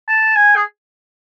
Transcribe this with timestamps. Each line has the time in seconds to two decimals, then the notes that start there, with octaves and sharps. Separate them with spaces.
0.08 A5
0.36 G#5
0.56 G#4